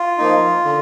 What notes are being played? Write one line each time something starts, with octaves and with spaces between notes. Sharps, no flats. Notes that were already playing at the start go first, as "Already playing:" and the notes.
Already playing: F4
F3 A#3 D#4
D3